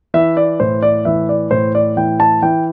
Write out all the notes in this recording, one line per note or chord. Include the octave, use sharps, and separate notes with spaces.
E3 E5
D5
A2 C5
D5
E3 E5
D5
A2 C5
D5
E3 G5
A5
E3 G5